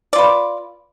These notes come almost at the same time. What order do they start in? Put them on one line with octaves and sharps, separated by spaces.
D5 F4 B4